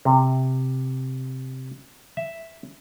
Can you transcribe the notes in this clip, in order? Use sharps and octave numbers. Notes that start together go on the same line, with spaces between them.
C3
E5